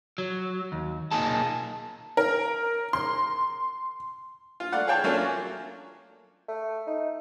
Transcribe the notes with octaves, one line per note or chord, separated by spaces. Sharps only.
F#3
D#2
B1 A#2 A#3 D#4 G#4 A5
A#4
C6
F4
A3 D5 F5 F#5
G#4 C#5 F5 G5 A5
F#3 A3 A#3 C#4 D4 F4
A3
D#4